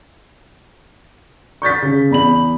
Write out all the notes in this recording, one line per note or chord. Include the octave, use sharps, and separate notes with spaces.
C#6 G6 A6 B6
C#3
E2 B5 F#7